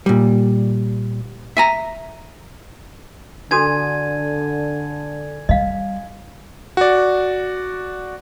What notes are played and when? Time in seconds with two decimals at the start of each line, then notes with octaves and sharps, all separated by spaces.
0.06 A#2 G3
1.57 E5 G#5 A#5
3.51 D3 D4 F#4 A4 G#5 G#6 D#7
5.49 G3 D#5 F5
6.77 F#4 D5